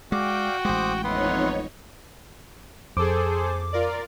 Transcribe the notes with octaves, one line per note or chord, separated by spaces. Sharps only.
G#3 F#4 D5 F5 G5 D6
A1 G#3 C5 D6 D#6
F2 B3 D#4 E4 C#5 F#5 C6
F2 G#4 A4 C5 D6
F4 A#4 D5